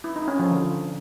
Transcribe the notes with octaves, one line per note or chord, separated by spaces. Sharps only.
E4
D#4
C#4
F3
D3